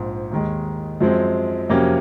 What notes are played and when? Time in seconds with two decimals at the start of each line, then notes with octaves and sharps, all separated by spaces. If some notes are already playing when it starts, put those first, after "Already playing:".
Already playing: A#1 G#2 F3
0.31 D#2 D#3 G#3
1.01 F#2 F3 G#3 C4
1.69 F2 C3 F#3 A#3 C#4